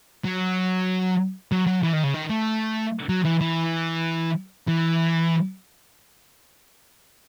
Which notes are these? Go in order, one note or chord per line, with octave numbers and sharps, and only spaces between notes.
F#3
F#3
F#3
E3
D#3
C#3
D#3
A3
F#3
E3
E3
E3